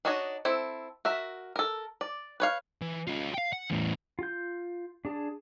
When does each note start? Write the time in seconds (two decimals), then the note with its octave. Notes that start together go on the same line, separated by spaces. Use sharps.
0.05 D4 D#4 F#4 C#5 D#5
0.45 C4 E4 A4
1.05 F#4 A#4 E5
1.56 A4 A#4
2.01 D5
2.40 B4 C#5 F5
2.81 E3
3.07 C#4 F4
3.34 F5 G5
3.53 F#5
3.70 E2 A2
4.19 F4 G6
5.05 D4 G#4 A5